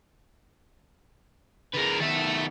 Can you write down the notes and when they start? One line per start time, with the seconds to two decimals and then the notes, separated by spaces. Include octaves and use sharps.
1.74 D3 G#4 A#4 B4
2.01 D#3 B3 A4 E5